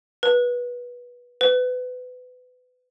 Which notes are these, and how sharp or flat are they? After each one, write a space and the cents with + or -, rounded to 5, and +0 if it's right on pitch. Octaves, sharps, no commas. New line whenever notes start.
B4 -20
B4 +25